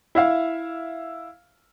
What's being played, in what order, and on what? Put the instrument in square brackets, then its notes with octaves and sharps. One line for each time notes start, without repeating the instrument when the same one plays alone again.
[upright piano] E4 E5 F5